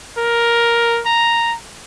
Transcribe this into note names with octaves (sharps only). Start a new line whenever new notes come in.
A#4
A#5